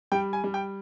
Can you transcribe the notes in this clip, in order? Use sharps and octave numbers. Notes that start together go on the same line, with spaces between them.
G3 G5
G#5
G3
G5